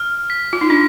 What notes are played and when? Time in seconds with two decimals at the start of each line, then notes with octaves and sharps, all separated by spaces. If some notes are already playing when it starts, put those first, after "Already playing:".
Already playing: F6
0.30 B6
0.53 F4
0.61 D#4
0.70 D4 B6